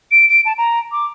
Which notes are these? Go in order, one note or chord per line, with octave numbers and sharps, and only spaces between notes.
D7
D7
A5
A#5
D6